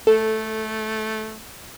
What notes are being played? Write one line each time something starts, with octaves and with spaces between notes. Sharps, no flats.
A3 A4